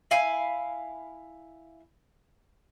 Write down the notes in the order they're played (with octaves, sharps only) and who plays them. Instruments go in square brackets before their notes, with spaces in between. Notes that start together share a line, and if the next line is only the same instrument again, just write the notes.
[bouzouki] E4 F5 G#5